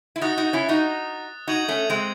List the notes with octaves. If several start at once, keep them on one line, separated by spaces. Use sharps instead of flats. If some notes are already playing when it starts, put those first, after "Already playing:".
E4
D#4 F#4 D#6 F#6 A6
D#4 F#4
C#4 E4
D#4 F#4
D#4 F#4 D#6 G#6 D#7 F#7
A3 C#4
G#3 C4